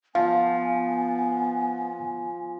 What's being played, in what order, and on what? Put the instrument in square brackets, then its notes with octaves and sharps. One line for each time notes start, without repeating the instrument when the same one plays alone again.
[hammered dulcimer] F3 [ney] B3 [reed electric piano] F5 [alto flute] G#5